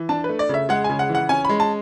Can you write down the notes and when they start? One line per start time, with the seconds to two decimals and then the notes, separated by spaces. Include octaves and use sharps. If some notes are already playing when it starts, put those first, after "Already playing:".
Already playing: E3
0.09 D4 A5
0.24 B4
0.29 A3
0.39 D5
0.49 C#3 E5
0.69 G#3 F#5
0.84 G#5
0.90 C#3
0.99 F#5
1.09 E3
1.15 F#5
1.29 C#4 G#5
1.45 G#3 B5
1.60 A5